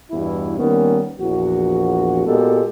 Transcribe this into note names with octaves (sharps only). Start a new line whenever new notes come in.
E2 G2 B2 E4
D#3 G3 A#3 B3 C#4
A#1 E2 F#4
A#2 G#3 B3 F#4 G4 A4